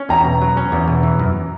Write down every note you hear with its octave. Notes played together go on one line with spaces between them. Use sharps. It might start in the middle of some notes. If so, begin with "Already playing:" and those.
Already playing: C#4
E2 A#5
B2
F#3
C#4
E2
B2
E3
F#2